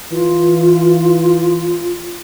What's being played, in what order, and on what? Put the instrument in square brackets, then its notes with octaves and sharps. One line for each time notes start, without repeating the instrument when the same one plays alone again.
[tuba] E3 [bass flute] F4